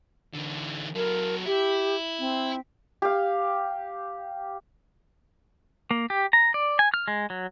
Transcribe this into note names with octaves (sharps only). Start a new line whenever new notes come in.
D3 E3
F#3 A4 A#4
E4 G4
C4
G4 F5
A#3
G4
A#5
D5
G#5
F6
G#3
F#3